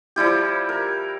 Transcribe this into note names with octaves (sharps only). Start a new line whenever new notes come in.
F3 G3 E4 G4
A#4